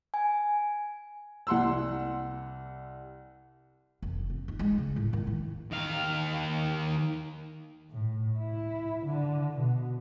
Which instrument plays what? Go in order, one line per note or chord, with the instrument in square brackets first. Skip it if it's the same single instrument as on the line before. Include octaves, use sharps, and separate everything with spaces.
[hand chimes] G#5
[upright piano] C2 F#5 C6 E6
[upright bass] F1
C4
D#4
G#3
C#3
A2
D#3
E4
[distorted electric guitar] D#2 F5
[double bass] A2
E4
D3
B2